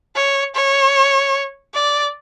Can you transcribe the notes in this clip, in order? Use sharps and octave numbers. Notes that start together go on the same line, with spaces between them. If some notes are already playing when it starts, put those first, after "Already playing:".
C#5
C#5
D5